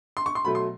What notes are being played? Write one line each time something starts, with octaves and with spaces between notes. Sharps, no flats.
C6
C#6
C6
B2 F#3 A3 B5
C6